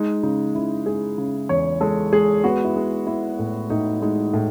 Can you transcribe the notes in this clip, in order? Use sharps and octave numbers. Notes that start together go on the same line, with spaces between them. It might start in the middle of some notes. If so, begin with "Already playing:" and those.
Already playing: G#3 D#4
C#3 D#4
C#3 E4
G#3 G#4
C#3
E2 C#5
G#3 A4
G#3 G#4
B3 F#4
E4
G#3
B3 E4
A2
A2 D#4
G#3 D#4
A2